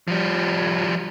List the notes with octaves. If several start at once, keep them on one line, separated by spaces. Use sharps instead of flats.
F3 G3